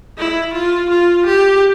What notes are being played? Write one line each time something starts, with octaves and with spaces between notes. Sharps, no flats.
E4
F4
F4
G4